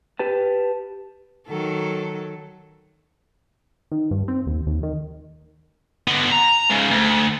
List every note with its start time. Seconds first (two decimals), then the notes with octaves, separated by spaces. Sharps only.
0.19 G4 B4 A5
1.48 D#3 F#3 A4
3.92 D#3
4.11 G2
4.28 C4
4.47 D#2
4.66 D#2
4.83 D#3
6.08 D3 B3
6.31 A#5
6.70 G#2 C#3
6.91 D2